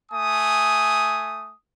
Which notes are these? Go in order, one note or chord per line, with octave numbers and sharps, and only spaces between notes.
A3 G#5 D#6